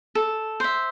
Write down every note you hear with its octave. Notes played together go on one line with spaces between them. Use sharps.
A4
C5 E5